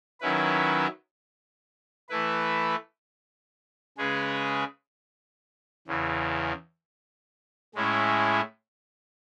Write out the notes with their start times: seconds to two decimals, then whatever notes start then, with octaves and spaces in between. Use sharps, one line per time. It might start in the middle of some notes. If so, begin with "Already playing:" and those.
0.20 D#3 F#3 C#4 E4 B4
2.09 E3 A3 E4 B4
3.98 C#3 G#3 C#4 G#4 B4
5.87 E2 C#3 E3
7.75 A2 G#3 C#4 E4